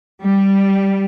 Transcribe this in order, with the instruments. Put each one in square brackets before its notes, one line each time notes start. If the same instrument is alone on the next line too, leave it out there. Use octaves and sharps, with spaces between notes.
[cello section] G3